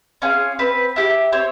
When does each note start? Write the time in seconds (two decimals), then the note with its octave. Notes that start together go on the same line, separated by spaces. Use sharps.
0.22 C#4 F4 G#4
0.59 C4 B4
0.96 E4 G4
1.32 C4 C#5